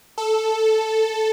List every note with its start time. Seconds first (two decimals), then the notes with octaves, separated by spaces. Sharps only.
0.18 A4